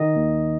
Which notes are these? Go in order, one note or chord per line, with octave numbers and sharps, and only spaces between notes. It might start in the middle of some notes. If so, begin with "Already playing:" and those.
Already playing: D#3 D#5
D#2